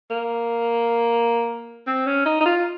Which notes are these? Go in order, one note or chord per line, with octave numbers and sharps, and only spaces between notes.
A#3
C4
C#4
D#4
D#4
F4